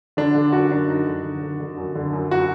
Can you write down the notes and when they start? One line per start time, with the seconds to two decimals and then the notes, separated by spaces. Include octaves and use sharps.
0.17 D3 D4
0.35 D3
0.52 F#2 F#4
0.71 F#2 D4
0.88 F#2 D#4
1.07 D3
1.24 D3
1.42 D3
1.60 D3
1.77 F#2
1.95 D3
2.13 F#2
2.31 F#4